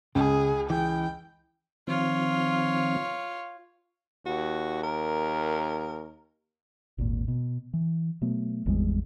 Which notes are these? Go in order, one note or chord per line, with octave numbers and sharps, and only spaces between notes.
C#2 C#3 G#4
E3 G#4 G5
D#3 F3 C4 F4 C#5
D#2 F#4
A#4
G#1 D#2 A#2
B2
E3
B2 F#3 A3 B3
G#1 E2 G3 G#3